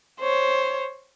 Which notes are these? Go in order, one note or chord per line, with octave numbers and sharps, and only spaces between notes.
C5 C#5